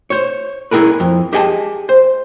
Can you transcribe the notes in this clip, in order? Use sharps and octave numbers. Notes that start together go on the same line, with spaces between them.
C5 C#5
E4 F4 G#4 A#4 B4
F2
G4 G#4 D#5 F#5 G#5 A5
C5